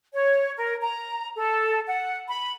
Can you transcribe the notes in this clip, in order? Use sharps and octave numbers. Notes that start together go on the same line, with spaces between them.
C#5
A#4
A#5
A4
F#5
B5